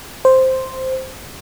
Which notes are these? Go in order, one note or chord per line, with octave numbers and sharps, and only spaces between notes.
C5